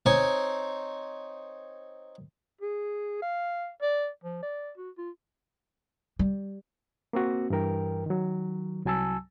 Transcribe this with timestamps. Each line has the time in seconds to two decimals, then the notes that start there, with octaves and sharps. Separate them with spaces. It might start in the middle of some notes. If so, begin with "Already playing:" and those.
0.06 C4 D#4 C#5 G#5
2.61 G#4
3.22 F5
3.82 D5
4.24 F3
4.42 D5
4.77 F#4
4.98 F4
6.19 G3
7.13 A#3 C4 F#4
7.50 G2 E3 A#4 G5
8.06 D#3 F#3
8.85 C2 F#3 G#5 A5 E6